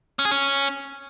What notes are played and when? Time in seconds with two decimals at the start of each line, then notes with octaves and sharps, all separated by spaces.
0.19 C#4
0.25 G#4
0.31 C#4